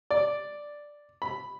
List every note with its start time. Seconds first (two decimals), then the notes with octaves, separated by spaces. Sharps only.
0.11 D5
1.22 B5